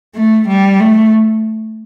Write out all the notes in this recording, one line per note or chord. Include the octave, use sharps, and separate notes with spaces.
A3
G3
A3